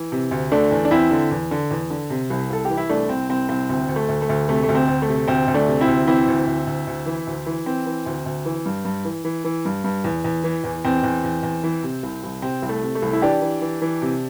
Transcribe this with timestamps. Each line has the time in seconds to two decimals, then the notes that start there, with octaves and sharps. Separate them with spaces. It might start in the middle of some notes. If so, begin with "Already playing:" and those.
Already playing: E3
0.12 C3
0.31 D2
0.52 D3 A3 D4
0.71 E2
0.85 D4
0.91 E2 C4 E4
1.11 D3
1.31 E2
1.51 D3
1.71 E2
1.90 D3
2.10 C3
2.30 C2
2.50 C2 A4
2.65 G4
2.70 E3
2.77 E4
2.89 C2 A3 D4
3.09 C2 C4
3.30 C2 C4
3.49 C2 C4
3.69 D2 C4
3.88 D2
3.96 A3
4.09 D2
4.22 A3
4.29 D2
4.48 C3 A3
4.64 A3
4.69 D2
4.75 C4
4.88 D2
5.02 A3
5.08 C3
5.28 D2 C4
5.47 D2
5.54 A3 D4
5.67 C3
5.81 C4 E4
5.87 D2
6.07 E3 C4 E4
6.28 D2
6.47 D2
6.67 D2
6.87 D2
7.06 E3
7.27 D2
7.46 E3
7.66 E3 C4
7.86 E3
8.06 D2
8.26 D2
8.46 E3
8.66 G2
8.85 G2
9.05 E3
9.25 E3
9.45 E3
9.65 G2
9.84 G2
10.04 E2
10.24 E2
10.44 E3
10.64 E2
10.84 E2 C4
11.03 E2
11.24 E2
11.43 E2
11.64 E3
11.83 C3
12.03 C2
12.24 C2
12.42 C3 C4
12.62 C2
12.69 A3
12.83 C3
12.95 A3
13.02 C2
13.13 E4
13.22 E3 D4 G4
13.42 E3
13.61 E3
13.82 E3
14.02 C3